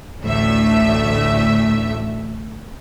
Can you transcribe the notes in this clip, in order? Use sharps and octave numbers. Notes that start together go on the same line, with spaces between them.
A1 D2 A2 A3 E5